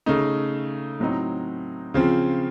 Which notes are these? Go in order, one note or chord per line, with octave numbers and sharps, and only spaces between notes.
C#3 A3 D#4
A2 F#3 C4 D#4
C#3 F3 C4